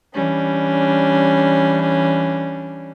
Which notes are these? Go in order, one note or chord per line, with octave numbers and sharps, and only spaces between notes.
E3 G3 C#4 D4